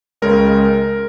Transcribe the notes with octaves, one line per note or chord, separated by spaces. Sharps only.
C#2 C#3 G#3 C#4 A#4